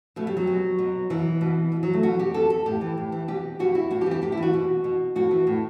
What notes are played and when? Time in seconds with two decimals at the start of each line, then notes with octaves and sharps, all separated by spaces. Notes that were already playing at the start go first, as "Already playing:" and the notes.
0.16 B2 A3
0.27 G3
0.37 F#3
0.47 B2
0.78 B2
1.10 B2 E3
1.41 B2
1.72 B2
1.83 F#3
1.94 A3
2.03 B2 F#4
2.19 G4
2.34 B2 A4
2.50 A4
2.66 A2 G4
2.81 E3
2.97 A2
3.12 E3
3.28 B2 G4
3.59 B2 F#4
3.75 E4
3.90 A2 F#4
4.01 G4
4.06 E3
4.11 G4
4.22 A2 G4
4.32 E4
4.37 E3
4.42 F#4
4.53 B2
4.84 B2
5.15 A2 F#4
5.31 E3
5.47 A2